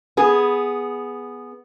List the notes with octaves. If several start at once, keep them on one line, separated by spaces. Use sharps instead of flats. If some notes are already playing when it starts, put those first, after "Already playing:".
B3 G#4